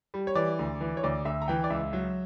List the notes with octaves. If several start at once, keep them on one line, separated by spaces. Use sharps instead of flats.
G3
C#5
E3 D5
D2
E3
C#5
D2 D5
D2 E5
A#5
E3 G5
D5
C#2 E5
F#3